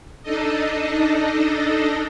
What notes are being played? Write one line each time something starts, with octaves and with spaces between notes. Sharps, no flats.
D4 D#4 A4 D#5